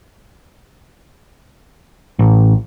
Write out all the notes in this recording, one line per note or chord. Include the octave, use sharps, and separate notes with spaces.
A1